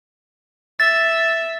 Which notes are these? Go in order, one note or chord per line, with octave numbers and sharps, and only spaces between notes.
E5 A6